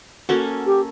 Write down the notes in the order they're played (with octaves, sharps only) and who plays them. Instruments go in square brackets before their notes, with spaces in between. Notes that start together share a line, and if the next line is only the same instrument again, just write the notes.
[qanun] A#3 C#4 A4 [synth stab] F#4
[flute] G4